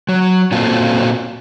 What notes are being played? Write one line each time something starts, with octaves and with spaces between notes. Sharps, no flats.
F#3
A#2 A#3 C4 F4 F#4 A4